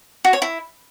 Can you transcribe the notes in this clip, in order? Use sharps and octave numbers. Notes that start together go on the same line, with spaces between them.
F#4
C#5
E4